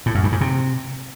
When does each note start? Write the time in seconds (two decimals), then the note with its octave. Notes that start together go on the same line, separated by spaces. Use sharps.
0.06 A2
0.15 F#2
0.23 G2
0.32 G#2
0.41 C3